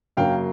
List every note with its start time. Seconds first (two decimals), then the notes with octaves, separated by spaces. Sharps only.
0.17 F#2 C#3 F#3 A#3 F5 G5